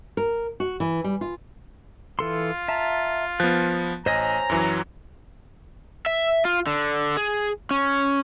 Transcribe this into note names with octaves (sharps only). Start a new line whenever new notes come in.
A#4
F#4
E3
G3
F4
E3 F4 A4 C6
E5 A5 A#5
F3 B3 F#6
A1 C5 C#5 D#5 G#5 A#5 A#6
F#2 E3 F#3
E5
F4
D3
G#4
C#4